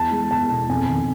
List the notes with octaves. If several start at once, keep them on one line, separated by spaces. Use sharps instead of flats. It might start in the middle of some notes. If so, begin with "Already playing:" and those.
Already playing: E2 A5
G#3
E2 A5
B2
F2 G#5
D#3